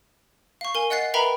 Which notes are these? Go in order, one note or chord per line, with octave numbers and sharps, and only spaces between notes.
F5 C#6
A#4 G#5
D#5 F#5 F#6 A6 C7
A#4 B4 E5 G5 A#5 B5